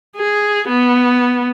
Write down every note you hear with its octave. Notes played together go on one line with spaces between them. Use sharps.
G#4
B3